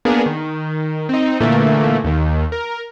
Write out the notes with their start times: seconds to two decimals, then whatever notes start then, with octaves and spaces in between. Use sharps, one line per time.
0.05 A#3 B3 D4 G#4 A#4
0.26 D#3
1.09 C4 D#4
1.40 A#2 D3 E3 A3 A#3
2.04 D#2 D#3
2.52 A#4